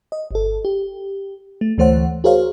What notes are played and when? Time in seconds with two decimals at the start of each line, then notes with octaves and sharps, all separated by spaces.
0.12 D#5
0.31 G1 A4
0.65 G4
1.61 A3
1.78 D2 E3 A3 C5 C#5 F#5
2.24 F#4 G#4 A#4 C5 C#5 F5